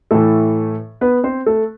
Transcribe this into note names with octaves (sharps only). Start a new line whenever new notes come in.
A2 E3 A3 A4
B3 B4
C4 C5
A3 A4